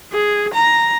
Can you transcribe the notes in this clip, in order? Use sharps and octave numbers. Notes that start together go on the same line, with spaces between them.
G#4
A#5